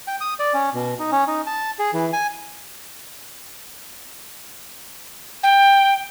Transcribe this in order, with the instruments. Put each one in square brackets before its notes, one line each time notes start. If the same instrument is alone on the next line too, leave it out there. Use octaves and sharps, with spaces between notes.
[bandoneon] G5
D#6
D5
C#4
B2
D#4
C#4
D#4
A5
G#4
E3
G#5
[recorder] G5